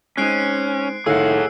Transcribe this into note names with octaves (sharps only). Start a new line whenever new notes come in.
G#3 C4 C#4 D#4 F#6 C7 D7
C2 A2 D#3 G#4 F5 F#5 E6